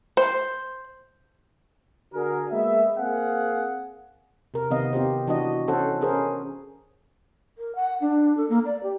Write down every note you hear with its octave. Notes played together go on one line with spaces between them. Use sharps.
C5
D3 F#4 G#4 A#4
G#3 A#3 B3 E5
A#3 C4 G#4 F5 F#5
C3 A#4
C3 D#3 B3 D#5 F5
C4 F4 G4 C5
E3 D4 F#4 D#5
E3 C#4 A4 C5 F#5
C#4 G#4 A#4 C5
A#4
F#5
D4
A4
A#3
D5
G4